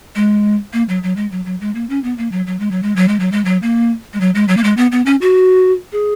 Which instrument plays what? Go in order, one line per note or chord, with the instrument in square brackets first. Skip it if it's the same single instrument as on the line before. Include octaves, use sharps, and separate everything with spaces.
[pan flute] G#3
A#3
F#3
F#3
G#3
F#3
F#3
G#3
A#3
C#4
B3
A#3
F#3
F#3
G#3
F#3
G#3
F#3
G#3
F#3
G#3
F#3
A#3
G#3
F#3
G#3
F#3
A#3
G#3
B3
B3
C#4
F#4
G#4